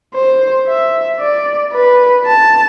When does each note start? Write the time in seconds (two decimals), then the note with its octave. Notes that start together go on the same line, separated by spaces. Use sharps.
0.15 C5
0.67 E5
1.20 D5
1.72 B4
2.25 A5